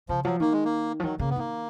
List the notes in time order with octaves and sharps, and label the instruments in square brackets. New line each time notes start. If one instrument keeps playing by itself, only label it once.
[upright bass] C#3 [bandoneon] F3
[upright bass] F3 [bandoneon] F#3
[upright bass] D#3 [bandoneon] A#3
[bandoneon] G#3
A#3
[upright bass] F3
[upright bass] D#3 [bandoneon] F#3
[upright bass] C#3 [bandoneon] A#3
[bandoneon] B3
[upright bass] D#3 [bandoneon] A#3